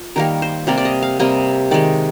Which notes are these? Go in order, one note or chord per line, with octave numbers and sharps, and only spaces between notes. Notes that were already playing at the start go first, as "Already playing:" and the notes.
Already playing: F4
D#3 G3 A#3 A#4
C5
C3 G3 A#3 D5
D5
D#5
F5
C3 G3 A#3 D#5
D#3 G#3 D5